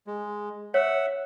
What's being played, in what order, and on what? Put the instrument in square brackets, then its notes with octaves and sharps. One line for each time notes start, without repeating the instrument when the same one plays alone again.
[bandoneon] G#3
[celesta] C#5 [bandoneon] E5 F#5